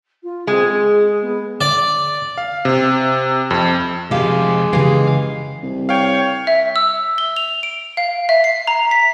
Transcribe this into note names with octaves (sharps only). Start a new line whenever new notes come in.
F4
G#3 C4
G#4
B3
D5
F5
C3
F2
C3 F3 G#3 G4 F5
C#3 E3 G4 G#4 F5
C2
C#5 F5 G5
E5
E6
G7
F7
D7
F5
E5
C7
A#5
B6